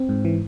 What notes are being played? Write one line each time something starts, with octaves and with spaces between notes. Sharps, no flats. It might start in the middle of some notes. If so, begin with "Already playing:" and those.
Already playing: C4
G#2
E3